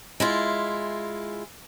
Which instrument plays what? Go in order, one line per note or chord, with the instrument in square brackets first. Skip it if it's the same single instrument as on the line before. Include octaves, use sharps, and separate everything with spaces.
[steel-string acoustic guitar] G#3 E4 F4